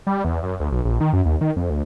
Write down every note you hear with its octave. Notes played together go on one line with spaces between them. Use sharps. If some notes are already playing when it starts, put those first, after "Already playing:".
G3
E2
F#2
D2
B1
A#1
D#3
F#2
D#2
D#3
F2
D2